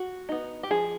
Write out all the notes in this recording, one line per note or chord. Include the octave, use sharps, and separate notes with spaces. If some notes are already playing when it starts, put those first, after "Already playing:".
Already playing: F#4
B3 D#4
G4
F3 G#4